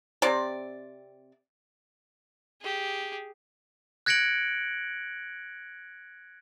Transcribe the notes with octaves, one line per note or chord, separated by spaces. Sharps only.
C3 C4 D5
G4 G#4
F#6 G#6 A#6 C#7 D7 F#7